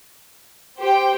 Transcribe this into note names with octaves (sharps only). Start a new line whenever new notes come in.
G4 C5 G5